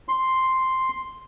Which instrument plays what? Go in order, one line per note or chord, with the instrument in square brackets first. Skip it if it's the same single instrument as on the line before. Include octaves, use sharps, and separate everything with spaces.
[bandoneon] C6